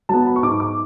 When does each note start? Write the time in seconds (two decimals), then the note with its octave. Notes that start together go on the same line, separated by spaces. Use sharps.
0.09 F#3 B3 A5
0.26 B5
0.36 C#6
0.43 G#2 D6
0.60 D6